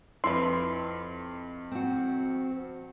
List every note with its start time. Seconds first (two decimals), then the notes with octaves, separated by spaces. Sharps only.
0.24 F2 E4 B4 C6 C7
1.71 C4 F#4